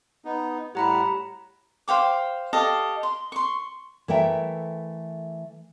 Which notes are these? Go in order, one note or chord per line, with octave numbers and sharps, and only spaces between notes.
B3 D#4
A2 G3 G4 F#5 A#5 B5
C5 F5 G5 D6
G4 A4 D#5 F5
C6
C6 C#6
E3 A3 A4 A#4 E5 G5